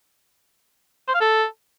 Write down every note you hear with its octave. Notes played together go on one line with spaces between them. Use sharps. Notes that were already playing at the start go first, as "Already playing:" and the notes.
C5
F5
A4